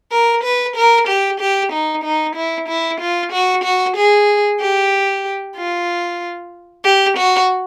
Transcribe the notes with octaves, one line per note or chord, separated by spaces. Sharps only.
A#4
B4
A#4
G4
G4
D#4
D#4
E4
E4
F4
F#4
F#4
G#4
G4
F4
G4
F#4